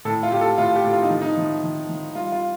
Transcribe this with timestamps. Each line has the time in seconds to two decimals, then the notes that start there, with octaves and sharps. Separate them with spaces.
0.05 A2 A4
0.23 F4
0.31 A2 G4
0.41 A4
0.58 A2 F4
0.76 G4
0.84 A2
0.93 F4
1.02 D#4
1.10 F3
1.22 D#4
1.37 F3
1.63 F3
1.89 F3
2.15 G3 F4
2.32 F4